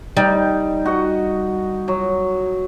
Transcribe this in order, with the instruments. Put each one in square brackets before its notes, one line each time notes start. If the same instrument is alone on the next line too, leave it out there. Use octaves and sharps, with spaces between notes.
[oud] G3 [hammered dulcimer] D#4
[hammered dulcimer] F#4 D#5 F#5
F#3